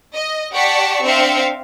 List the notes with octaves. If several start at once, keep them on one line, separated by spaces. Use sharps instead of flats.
D#5
G4 D5 F#5 A5 C#6 B6
C4 D4 E5 F5 C#7